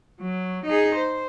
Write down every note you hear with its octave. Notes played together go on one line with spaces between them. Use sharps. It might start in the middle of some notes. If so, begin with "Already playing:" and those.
F#3
D#4 G#4
C5